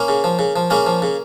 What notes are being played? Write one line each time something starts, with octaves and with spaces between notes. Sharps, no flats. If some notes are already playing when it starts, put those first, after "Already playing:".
Already playing: A#3 C#4
C#3
F3
C#3
F3
C#3 A#3 C#4
F3
C#3